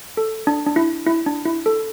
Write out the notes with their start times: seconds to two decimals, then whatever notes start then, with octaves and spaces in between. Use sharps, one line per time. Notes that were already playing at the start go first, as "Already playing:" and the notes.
0.17 A4
0.47 D4
0.66 D4
0.76 E4
1.06 E4
1.26 D4
1.45 E4
1.66 A4